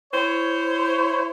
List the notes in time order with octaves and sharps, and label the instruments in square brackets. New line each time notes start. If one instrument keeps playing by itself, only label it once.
[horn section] E4 C5 C#5